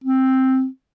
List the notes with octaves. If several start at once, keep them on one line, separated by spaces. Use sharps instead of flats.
C4